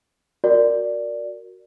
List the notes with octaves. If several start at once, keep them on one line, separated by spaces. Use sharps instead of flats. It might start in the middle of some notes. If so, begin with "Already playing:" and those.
F#4 A#4 D5